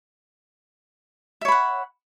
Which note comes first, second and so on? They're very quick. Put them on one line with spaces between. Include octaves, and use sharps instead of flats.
E5 C#5 B5 F#5